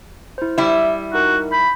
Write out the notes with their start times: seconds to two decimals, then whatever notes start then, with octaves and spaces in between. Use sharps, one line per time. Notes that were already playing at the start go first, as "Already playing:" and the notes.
0.38 E4 C5
0.58 G3 E4 B5
1.13 D#4 F#4 A#4
1.52 B5 G6